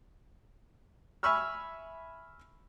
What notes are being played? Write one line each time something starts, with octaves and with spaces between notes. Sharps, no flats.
E5 G#5 B5 C#6 E6 F6